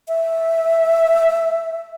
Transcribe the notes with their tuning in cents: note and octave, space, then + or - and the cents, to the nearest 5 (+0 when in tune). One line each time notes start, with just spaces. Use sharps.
E5 -5